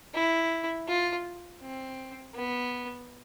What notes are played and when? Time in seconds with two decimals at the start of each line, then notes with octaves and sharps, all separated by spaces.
0.14 E4
0.88 F4
1.61 C4
2.35 B3